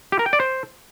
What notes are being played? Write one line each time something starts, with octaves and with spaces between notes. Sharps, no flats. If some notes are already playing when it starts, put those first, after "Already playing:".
G4
A#4
G5
D5
C5